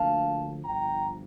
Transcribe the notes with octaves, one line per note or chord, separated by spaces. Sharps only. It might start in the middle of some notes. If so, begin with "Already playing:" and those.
Already playing: D2 D3 F3 A#3 F5 A5
G1 G2 F3 G5 A#5